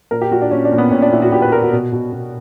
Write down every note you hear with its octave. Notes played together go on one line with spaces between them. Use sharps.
A#2 A#4
G4
A#2 F#4
D4
A#2 C#4
D4
A#2
B3
A#2 C#4
D4
A#2 E4
F#4
A#2 G4
B4
A#2 A#4
F#4
B2
B2
B2